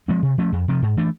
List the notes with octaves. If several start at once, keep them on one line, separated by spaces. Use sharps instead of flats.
F3 G#3 C4
C3
F3 A3 C#4
F2
C3 F3
G#2
E3 A3 D4